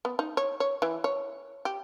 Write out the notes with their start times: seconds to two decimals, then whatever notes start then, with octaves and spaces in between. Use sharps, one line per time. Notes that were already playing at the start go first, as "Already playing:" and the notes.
0.05 B3
0.19 D#4
0.37 C#5
0.60 C#5
0.82 E3
1.04 C#5
1.65 G4